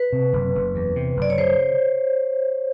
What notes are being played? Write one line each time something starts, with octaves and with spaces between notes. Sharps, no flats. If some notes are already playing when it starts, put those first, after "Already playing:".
Already playing: B4
C3
F#1
F#1
E2
C3
F#1
D5
C#5
C#3 C5